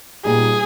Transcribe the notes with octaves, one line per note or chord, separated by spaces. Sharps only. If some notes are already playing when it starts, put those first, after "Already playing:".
A#2 G3 B3 D#4 G4 G#4